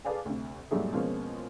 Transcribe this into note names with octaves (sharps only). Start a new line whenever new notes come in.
G#4 A4 B4 D5 F5 G#5
D2 C3
G#2 B2 F#3 G3 A3 G#4
B2 F3 G#3 A#3 C4 C#4